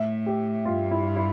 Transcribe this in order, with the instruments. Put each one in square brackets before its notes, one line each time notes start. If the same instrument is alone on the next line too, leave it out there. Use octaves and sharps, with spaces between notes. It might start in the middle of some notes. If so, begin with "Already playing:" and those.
Already playing: [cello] A2 [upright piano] E5
[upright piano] G4
[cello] G2 [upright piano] F4
[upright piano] E4
E4